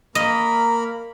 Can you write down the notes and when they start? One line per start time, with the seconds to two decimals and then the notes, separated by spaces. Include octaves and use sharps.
0.15 A#3 A#4 D#5 B5